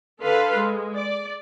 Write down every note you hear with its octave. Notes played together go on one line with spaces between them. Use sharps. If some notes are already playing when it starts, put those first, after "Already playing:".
D3 A4 B4 F5 C6
G#3
D5